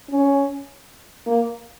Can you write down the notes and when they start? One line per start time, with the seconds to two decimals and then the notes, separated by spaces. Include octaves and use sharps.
0.10 C#4
1.27 A#3